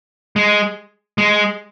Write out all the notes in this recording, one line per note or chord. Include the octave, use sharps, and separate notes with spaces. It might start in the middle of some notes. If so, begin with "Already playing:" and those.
G#3
G#3